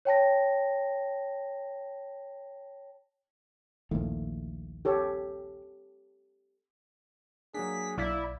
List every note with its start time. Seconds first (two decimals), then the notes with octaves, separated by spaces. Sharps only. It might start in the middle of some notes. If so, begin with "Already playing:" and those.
0.05 C#5 G5 A5 A#6
3.91 A#1 D#2 A3
4.85 G4 A4 C#5
7.54 F#3 A#3 D4 G#4 B6
7.98 B1 E4 D5 F5